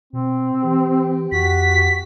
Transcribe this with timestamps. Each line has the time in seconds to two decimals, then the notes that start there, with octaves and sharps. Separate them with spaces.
0.13 B2 C4
0.64 E3 G4
1.32 F2 F#4 B6